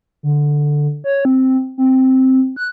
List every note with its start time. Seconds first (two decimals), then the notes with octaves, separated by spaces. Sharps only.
0.23 D3
1.04 C#5
1.25 C4
1.78 C4
2.56 F#6